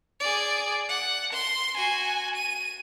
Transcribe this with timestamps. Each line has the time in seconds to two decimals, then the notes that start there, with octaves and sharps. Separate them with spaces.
0.20 G#4 D5
0.89 F#5
1.33 C6
1.77 F#4 G#5
2.35 D#7